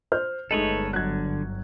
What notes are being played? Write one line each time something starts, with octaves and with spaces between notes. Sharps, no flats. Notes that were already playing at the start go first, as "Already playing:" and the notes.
C5 F6 G6
G1 G#3 A3 D#4 A4 B4 C#5 D#5
D3 F#3 F#6 G#6